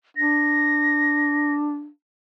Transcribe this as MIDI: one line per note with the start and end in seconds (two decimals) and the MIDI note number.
0.17 1.88 62
0.17 1.52 94